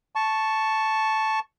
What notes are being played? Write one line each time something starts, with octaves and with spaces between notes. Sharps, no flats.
A5 C#6